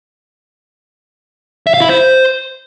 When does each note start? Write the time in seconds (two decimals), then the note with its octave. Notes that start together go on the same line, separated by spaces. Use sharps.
1.67 E5
1.74 F5
1.81 E4
1.89 C5